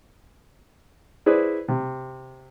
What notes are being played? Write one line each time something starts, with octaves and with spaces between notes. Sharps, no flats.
E4 G#4 B4 C5 D5
C3